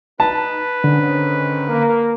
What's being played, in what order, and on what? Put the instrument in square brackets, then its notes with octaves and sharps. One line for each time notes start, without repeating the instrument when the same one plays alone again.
[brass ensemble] D#4 [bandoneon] B4 [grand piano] A5
[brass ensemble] G#2 D#3 C#4 [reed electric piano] D3
[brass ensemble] A#3